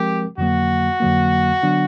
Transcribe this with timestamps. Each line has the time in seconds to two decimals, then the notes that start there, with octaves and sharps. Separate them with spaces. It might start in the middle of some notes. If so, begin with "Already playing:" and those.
Already playing: F3 G#3 C4 G4 A#4
0.38 F2 D3 F#3 A#3 F#4
1.00 F2 D3 F#3 A#3
1.63 D3 F#3 B3 D4